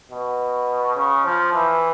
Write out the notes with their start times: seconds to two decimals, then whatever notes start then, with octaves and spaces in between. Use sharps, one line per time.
0.11 B2
0.97 C#3
1.25 F3
1.53 E3